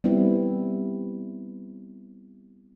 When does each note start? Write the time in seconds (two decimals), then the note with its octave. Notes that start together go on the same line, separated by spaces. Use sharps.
0.04 G3 B3 C4 E4